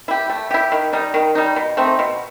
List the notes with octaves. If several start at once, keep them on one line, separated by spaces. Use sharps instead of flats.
E4 G4
A3
E4 G4
D#3
G3 D#4
D#3
G3 D#4
B2
A3 C4 D#4
B2